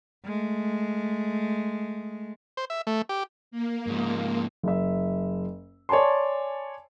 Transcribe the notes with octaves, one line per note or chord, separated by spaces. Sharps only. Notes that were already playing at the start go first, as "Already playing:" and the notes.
G#3 A3
C5
E5
A3
G4
A#3
G#2 F3
F#1 E5
C#5 D5 G#5 A5 C6